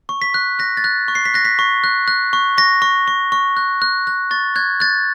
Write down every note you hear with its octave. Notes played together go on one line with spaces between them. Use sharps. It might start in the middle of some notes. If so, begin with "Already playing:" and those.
C#6
B6
F#6
F#6 A#6
A6
F#6
C#6
C7
B6
F#6 A#6
B6
C#6
F#6
F#6
C#6
C#6 A#6
C#6
C#6
C#6
F#6
F#6
F#6
C#6 A6
F#6 G#6
F#6 A6